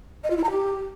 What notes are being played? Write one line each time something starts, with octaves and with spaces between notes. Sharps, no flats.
D#5
F4
E4
A#5
G4